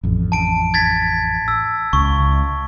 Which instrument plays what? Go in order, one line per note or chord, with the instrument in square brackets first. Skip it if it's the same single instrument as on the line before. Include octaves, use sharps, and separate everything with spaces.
[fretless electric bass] A1 F2
[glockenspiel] A5 D7
G#6 A6 B6
E6
[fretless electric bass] C#2 [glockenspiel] C#6